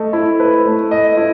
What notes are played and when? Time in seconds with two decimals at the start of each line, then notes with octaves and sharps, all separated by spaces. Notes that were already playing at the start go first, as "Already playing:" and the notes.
Already playing: A3 D#5
0.13 E4
0.40 B4
0.66 A3
0.91 D#5
1.17 E4